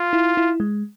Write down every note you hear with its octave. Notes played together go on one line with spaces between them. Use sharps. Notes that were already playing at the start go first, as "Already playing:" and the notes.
Already playing: F4
E4
E4
G#3